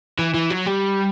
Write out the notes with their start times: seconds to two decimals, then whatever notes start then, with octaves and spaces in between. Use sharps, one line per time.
0.19 E3
0.34 E3
0.50 F#3
0.66 G3